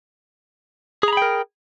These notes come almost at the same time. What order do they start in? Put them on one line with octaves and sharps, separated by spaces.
G#4 A#5 B5 G5 A#4